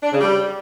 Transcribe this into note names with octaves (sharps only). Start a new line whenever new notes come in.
D4
C#3
G3